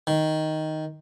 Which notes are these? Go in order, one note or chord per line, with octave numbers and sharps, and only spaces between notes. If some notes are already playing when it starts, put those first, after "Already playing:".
D#3